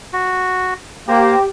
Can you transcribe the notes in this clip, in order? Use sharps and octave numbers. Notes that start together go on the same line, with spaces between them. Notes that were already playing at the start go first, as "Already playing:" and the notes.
F#4
A#3 G4 C5 A#5